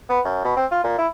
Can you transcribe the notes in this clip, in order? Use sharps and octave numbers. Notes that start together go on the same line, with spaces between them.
B3
F#2
B2
C4
F4
A#2
E4